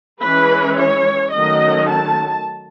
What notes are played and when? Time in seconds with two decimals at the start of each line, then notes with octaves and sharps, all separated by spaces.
0.23 E3 G#3 C#4 B4
0.78 C#5
1.33 D#3 F#3 A3 C#4 D#5
1.88 A5